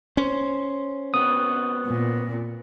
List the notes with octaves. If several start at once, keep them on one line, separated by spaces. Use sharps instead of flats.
C#4 C5
B3 C4 F#4 D#6
A#2